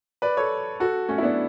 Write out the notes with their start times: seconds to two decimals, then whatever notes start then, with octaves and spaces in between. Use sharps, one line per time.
0.22 B4 D5
0.37 A4 C#5
0.80 F#4 A4
1.09 A3 C#4
1.18 E4
1.22 B3 D4